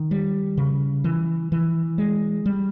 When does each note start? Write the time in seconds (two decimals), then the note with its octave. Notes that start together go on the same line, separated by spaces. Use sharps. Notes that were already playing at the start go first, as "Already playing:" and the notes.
Already playing: D#3
0.11 G3
0.57 C#3
1.04 E3
1.52 E3
1.98 G#3
2.46 G3